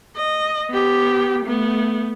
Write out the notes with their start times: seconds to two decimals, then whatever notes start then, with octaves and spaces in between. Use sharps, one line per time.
0.16 D#5
0.70 B3 G4
1.45 A3 B3